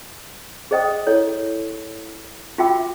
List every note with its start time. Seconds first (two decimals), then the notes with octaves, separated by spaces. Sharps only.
0.71 G#4 C5 D#5 G5 D#6
1.07 E4 A4 C#5
2.58 F4 F#4 E5 G5 D6 E6